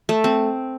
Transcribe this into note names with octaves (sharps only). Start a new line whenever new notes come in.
A3
C4